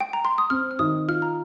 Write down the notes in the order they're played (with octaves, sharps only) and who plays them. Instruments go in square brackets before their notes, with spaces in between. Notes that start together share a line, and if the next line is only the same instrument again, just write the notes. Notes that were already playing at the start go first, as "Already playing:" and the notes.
[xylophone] G5
A#5
C6
D#6
[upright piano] C4 [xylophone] F6
[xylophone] F6
[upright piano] D#3 [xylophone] D#6
[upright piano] F4 [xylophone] F6
[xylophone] A#5